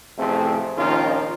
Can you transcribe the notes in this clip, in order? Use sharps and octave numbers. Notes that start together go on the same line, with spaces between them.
A1 F2 C3 A3 C4 G#4
A#1 D#2 D#3 C#4 F4 A#4